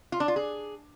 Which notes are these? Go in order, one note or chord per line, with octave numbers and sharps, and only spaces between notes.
F4
D4
F4
G#4